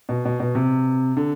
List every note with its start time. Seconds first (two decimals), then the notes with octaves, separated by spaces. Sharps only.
0.09 B2
0.25 B2
0.40 B2
0.55 C3
1.17 D3